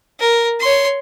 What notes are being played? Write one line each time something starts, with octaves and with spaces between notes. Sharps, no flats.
A#4
C#5 C6